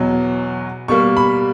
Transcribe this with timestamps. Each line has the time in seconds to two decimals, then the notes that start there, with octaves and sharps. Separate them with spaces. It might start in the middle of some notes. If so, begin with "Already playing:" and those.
Already playing: E2 B2 F#3
0.88 B2 G3 A#3 C#6
1.17 B5